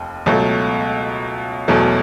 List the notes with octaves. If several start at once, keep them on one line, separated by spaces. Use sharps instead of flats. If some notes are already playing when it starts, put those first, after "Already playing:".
Already playing: F1 D#2
C#2 B2 F#3 A3
E1 E2 B2 F#3 A3